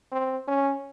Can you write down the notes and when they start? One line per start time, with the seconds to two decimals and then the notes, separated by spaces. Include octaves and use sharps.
0.12 C4
0.48 C#4